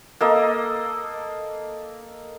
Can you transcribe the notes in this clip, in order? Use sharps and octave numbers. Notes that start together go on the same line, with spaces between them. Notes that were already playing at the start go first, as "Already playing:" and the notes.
A#3 A4 D#5